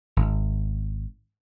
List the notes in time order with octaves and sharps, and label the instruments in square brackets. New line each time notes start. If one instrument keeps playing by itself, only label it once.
[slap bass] G#1